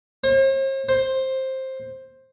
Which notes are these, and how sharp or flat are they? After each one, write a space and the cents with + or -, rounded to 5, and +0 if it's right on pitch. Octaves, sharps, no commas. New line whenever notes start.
C5 +45
C5 +10